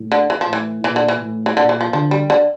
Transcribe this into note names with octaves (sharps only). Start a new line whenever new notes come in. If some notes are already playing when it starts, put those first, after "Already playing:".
Already playing: A2
D3
E3
F3
A2
E3
A#2 E3
D3
E3
A2
E3
A#2 D3
E3
F3
D3 F3
G3
D3